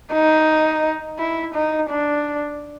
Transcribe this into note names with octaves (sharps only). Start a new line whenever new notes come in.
D#4
E4
D#4
D4